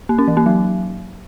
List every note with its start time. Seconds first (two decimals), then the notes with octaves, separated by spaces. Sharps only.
0.09 A#3
0.18 C#4
0.28 E3
0.37 A#3
0.46 F#3